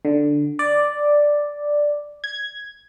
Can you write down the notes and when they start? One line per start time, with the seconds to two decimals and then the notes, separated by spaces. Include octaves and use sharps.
0.05 D3
0.59 D5
2.24 G#6